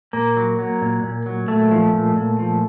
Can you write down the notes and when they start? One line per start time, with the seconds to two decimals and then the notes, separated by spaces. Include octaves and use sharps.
0.13 A#2 A#3
0.36 F#3
0.59 F#3
0.82 A#2
1.03 A#2
1.26 F#3
1.48 A#2 A3
1.71 F3
1.93 A#2
2.16 A#2
2.39 F3